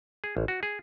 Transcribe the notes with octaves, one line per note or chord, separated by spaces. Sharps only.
G#4
A1
F#4
G#4